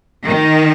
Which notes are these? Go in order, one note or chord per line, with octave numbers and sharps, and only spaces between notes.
D#3